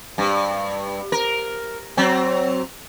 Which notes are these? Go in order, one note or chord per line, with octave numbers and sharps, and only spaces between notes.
G2
A#4
F#3 C4